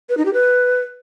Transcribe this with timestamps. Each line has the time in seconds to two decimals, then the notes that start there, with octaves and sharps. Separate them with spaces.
0.09 B4
0.17 D#4
0.25 G4
0.34 B4